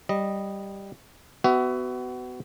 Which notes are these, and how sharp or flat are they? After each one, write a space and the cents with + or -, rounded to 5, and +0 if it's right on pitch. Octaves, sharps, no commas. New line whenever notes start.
G3 +0 D#5 -10
B3 +25 F#4 +25 E5 +0